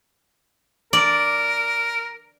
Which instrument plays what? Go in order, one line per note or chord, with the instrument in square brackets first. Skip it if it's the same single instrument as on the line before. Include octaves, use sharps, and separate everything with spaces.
[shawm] A#4 [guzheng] D5